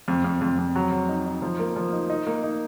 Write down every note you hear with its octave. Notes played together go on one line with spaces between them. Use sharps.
F2
F2
F2
F2
F#3
F#3
D#4
D#4
F3
A#3
F3
D#4
D#4
A#3
D#4